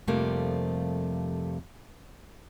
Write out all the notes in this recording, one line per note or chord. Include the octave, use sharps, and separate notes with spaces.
F2 C3 F3 G3 A3 A#3